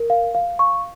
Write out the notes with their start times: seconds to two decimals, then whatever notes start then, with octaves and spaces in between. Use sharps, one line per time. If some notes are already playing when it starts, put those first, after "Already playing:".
Already playing: A#4
0.10 F5
0.35 F5
0.59 C#6